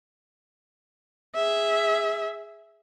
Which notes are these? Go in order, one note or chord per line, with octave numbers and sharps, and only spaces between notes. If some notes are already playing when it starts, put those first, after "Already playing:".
G#4 E5